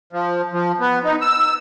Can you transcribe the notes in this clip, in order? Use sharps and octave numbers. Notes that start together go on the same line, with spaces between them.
F3
F3
B3
D#4
E6